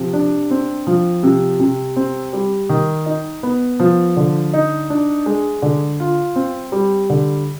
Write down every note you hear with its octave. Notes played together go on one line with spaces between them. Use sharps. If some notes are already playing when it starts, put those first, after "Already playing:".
Already playing: C3 F3
D4
C4
F3
C3
C3
C4
G3
D#3
D#4
B3
F3
D3
D#4
D4
G#3
D3
F4
C4
G3
D3